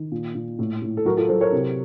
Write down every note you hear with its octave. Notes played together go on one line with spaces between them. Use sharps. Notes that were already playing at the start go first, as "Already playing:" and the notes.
Already playing: D#3
A#2
A#2
A2
A2
A4
F#3 F#4 A#4
F4 A4
F#3 A4 C5
A#4 C#5
C3